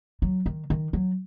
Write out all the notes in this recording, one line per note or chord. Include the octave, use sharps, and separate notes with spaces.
F#3
D#3
D#3
F#3